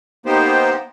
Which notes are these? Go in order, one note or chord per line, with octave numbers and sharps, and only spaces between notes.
A#3 B3 D#4 G4 C5